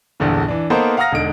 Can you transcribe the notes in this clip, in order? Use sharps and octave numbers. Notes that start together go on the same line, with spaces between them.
A#1 E2 G2 A#2 D3 E3
E3 D4
A#3 B3 D#4 A4 A#4 C5
F5 F#5 A#5 D#6 F6 A#6
E1 D3 G#3 D#4 D7